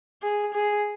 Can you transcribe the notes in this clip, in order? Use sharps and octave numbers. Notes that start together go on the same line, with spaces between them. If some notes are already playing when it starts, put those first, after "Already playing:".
G#4
G#4